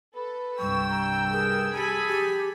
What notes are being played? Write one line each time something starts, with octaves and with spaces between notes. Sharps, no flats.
A4 B4
C2 G2 G5 C#6 E6
A#5
G#4 A#4
G4 A4 G#5 B5
G4